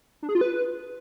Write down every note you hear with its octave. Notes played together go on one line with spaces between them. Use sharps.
D4
G#4
F4
B4